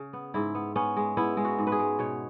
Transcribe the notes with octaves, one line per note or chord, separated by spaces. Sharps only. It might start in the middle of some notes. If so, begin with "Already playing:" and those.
Already playing: C#3
B3
G#2 E4
B3
B3 C#4
G#3
B3 E4
G#3
F#4
G#2
B4
G#4
G#3
B2 C#5